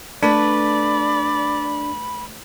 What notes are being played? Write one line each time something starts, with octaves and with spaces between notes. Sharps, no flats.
A3 D4 B4 D5 B5